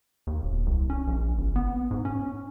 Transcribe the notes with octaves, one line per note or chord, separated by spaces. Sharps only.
D#2
D1
C2
C#4
A#1
G1
B3
G#2
C#4